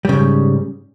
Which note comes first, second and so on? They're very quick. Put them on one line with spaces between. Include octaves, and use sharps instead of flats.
G3 C#3 G#2